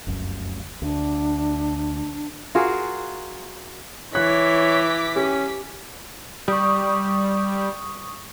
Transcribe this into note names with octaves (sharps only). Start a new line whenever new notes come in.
F1 C#2 F#2
D2 D4
F4 F#4 G#4 A#4
E3 C#5 D6 F#6 B6
C#4 G4
G3 C#6 D#6